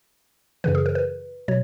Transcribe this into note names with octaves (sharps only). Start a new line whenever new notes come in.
F#2 C#3 E3 B4
G#4
A#4
B4
B2 F#3 C#5